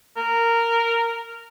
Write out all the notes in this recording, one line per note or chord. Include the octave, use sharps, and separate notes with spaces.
A#4